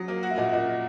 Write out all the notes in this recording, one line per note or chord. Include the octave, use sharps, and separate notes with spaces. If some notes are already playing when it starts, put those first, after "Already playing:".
Already playing: F#3 D#6
A#3
F#4
E5
A#2 D#5 F#5
A#2 D#5